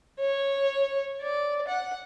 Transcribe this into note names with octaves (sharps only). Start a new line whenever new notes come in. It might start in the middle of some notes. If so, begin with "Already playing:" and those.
C#5
D5
F#5